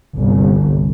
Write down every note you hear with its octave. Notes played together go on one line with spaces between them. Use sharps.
G1 C2